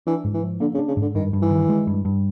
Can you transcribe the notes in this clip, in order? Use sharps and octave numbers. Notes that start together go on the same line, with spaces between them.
E3 D4
G#2
E3
F3
D3 A#3
C#3
D4
C#3
G#2 D3
G2 D#3
G2
E3
D#3
G#3
G2
G2